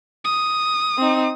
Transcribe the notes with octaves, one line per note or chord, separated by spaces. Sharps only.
D#6
C4 D#4